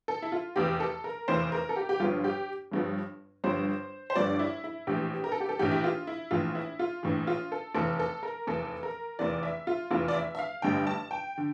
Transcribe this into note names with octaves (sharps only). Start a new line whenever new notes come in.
A4
E4
F4
F1 E2 E3 G4
A4
A#4
F1 E2 E3 C5
A#4
A4
G4
G4
G1 G2 F3 F4
G4
G1 G2 F3
G1 G2 F3 C5
C5
G1 G2 F3 D5
E4
E4
A#1 A2 E3 G4
A#4
A4
G4
A4
A#1 A2 E3 G4
E4
F4
E4
A#1 A2 E3 F4
E4
F4
A#1 A2 E3
F4
A4
F1 E2 E3 A4
A4
A#4
F1 E2 E3 A4
A#4
F1 E2 E3 D5
E5
F4
F1 E2 E3 F4
D5
E5
E5
F5
A1 G2 D3 G5
A5
G5
D3